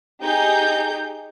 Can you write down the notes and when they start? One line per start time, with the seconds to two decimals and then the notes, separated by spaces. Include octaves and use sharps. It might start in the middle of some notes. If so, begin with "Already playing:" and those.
0.21 D#4 G4 G#4 G6